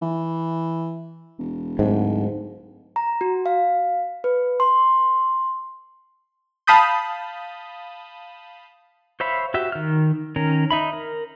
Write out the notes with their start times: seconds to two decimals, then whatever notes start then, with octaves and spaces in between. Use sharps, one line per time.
0.02 E3
1.39 E1
1.79 D1 G#2
2.96 A#5
3.21 F#4
3.46 F5
4.24 B4
4.60 C6
6.67 F5 A5 B5 D#6 G6
9.20 C5 C#5 E5 F5 B5
9.54 F#4 G4 E5
9.72 D#3 F6
10.36 D#3 C#4 A#4
10.71 D#4 E5 B5
10.93 A#4